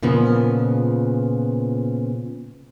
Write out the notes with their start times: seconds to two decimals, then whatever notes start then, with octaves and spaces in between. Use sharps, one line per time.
0.03 A#2 C#3 F3 B3